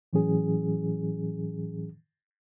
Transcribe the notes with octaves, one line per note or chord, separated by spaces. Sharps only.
A2 E3 F#3 C#4 G#4